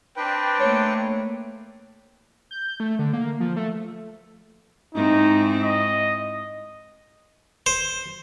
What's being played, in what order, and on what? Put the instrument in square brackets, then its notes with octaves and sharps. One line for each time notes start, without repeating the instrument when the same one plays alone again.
[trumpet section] C4 D4 [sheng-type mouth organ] B4 G5
[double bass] A3 A#3 [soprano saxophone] C#5
[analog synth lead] G6
A3
D3
A#3
F3
A3
[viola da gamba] G#2 C4 E4 [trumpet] D#4
[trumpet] D#5
[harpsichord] C5